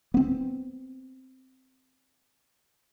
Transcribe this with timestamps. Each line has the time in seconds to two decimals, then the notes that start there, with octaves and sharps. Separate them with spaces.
0.14 B3 C4